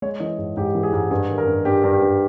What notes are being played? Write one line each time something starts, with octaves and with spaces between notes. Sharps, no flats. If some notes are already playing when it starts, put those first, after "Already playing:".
G#3 C#5
E3 D#5
G#2
G#2 G4
E3
G#4
G#2
G2 G#4
D#3
A#4
G2
G2 G4
G2
G4
G2